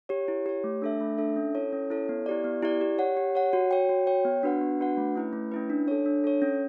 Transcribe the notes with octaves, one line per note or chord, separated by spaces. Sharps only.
G4 C#5
E4
G4 C#5
A3
D4 A4 E5
A3
D4 A4 E5
C#4
E4 A4 C#5
C#4
E4 A4 C#5
B3
E4 G4 D5
B3
E4 G4 D5
G4
C#5 F#5
G4
C#5 F#5
F#4
C#5 G5
F#4
C#5 G5
B3
D4 F#4 B4 F#5
B3
D4 F#4 B4 F#5
A3
C#4 E4 B4
A3
C#4 E4 B4
D4
A4 C#5
D4
A4 C#5
C#4